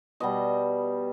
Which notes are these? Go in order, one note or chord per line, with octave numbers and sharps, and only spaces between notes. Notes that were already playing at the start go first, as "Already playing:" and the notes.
B2 G3 D#5